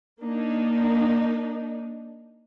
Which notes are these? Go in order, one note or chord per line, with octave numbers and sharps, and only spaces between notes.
A#3 D4 D#4